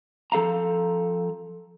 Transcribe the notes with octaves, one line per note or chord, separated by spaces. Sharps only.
F3 A4 F5 A#5